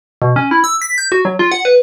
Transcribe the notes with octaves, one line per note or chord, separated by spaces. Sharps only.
B2
C#4
E4
E6
B6
G6
F#4
F#3
F4
F#5
B4